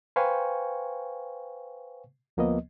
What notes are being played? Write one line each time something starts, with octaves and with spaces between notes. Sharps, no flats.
B4 C5 F5 G5 G#5 C#6
D2 F3 A#3 B3 D#5